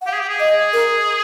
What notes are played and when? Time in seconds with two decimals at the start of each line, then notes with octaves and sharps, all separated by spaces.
0.01 F#5
0.06 G4 F5
0.13 G#4
0.20 G4
0.29 G#4
0.40 D#5
0.51 G#4
0.73 A#4